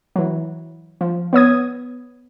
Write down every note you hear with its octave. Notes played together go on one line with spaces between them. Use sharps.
E3 F#3
F3
B3 C#5 D#6 G#6